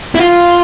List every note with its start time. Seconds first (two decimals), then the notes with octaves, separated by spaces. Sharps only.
0.15 E4
0.19 F4